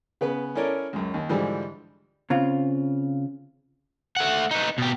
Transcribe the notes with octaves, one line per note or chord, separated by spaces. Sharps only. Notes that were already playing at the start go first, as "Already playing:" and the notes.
C#3 B3 B4
C#4 E4 A4 A#4 C#5 D5
C#2 F#2
D#2
G#2 D3 E3 F3 G3 E4
C#3 C4 F4
A3 F#5
D#4 B4
B2 G4